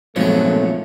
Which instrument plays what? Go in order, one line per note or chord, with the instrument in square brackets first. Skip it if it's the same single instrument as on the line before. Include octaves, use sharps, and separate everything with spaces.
[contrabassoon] G#1 [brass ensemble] A#2 A3 [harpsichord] F3 F#3 [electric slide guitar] G#3 B3 C#5